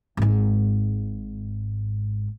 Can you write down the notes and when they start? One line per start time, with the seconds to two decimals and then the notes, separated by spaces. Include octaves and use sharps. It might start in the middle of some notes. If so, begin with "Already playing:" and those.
0.17 G#1 G#2